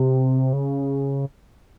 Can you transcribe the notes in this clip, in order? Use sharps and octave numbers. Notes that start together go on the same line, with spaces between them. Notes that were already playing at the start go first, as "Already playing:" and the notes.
Already playing: C3
C#3